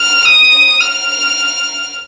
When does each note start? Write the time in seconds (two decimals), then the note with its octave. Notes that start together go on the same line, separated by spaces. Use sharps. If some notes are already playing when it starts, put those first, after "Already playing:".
Already playing: F6
0.25 D#6
0.81 F6